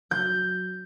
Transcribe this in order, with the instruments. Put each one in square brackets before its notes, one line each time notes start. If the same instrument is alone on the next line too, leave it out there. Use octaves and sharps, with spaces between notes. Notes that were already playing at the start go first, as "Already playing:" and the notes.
[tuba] F#3 [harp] G6